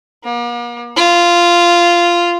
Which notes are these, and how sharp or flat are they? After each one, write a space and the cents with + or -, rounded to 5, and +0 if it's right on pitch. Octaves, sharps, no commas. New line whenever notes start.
A#3 +45
F4 -10